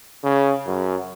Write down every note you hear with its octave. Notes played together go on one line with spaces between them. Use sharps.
C#3
F#2